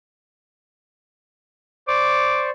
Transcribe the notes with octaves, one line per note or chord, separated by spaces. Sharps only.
C5 D5 C#6 D6